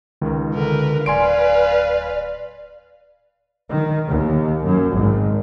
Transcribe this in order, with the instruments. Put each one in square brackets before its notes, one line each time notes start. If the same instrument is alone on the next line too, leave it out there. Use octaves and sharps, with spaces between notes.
[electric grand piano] C#2 [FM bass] D#3
[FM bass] D3 [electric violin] A#4 B4
[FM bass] D1 [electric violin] B4 F5 [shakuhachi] D5 [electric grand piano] G#5 C6 D7
[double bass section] D#3
D#2
F#2
G#1